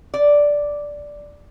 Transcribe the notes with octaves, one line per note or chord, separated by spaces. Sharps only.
D5